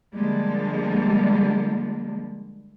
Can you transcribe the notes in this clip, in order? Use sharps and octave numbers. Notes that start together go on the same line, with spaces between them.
D3 F3 G3 G#3 A#3